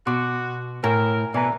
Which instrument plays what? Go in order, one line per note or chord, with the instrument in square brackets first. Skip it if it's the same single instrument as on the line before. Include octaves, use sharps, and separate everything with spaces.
[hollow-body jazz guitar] B2 [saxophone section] F#4 [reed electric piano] C6 D6
[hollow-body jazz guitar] A2 [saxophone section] E4 A#4 [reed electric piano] G#5 A#5
[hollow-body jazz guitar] B2 [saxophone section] D3 E3 [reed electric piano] D5 G#5 A#5